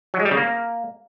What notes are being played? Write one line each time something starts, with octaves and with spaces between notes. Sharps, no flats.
F#3
G#3
G3
C#3
A#3